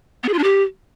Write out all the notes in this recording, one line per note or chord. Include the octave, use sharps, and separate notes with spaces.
B3
G#4
F4
D4
G4